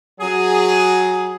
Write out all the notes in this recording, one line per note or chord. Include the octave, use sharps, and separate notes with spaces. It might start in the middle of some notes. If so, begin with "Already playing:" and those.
F#3 G#4